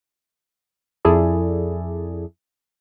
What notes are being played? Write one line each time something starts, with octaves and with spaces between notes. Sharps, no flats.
F2 E4 G#4 A4 D5